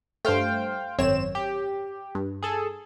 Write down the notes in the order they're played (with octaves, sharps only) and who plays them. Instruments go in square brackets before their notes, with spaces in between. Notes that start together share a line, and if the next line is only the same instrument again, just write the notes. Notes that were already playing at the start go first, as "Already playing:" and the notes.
[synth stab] G2 A3 [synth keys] C5 F5 G5
[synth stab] G#1 F#2 C#5 [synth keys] C4 E7
[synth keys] G4
[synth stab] G2
[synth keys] G#4 A4